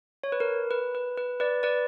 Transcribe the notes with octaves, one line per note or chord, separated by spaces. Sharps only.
C#5
B4
A#4
B4
B4
B4
B4 D5
B4 D5